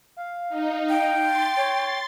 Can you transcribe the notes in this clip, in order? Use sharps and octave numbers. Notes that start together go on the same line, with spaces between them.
F5
D#4
G5
C6 A6
C#5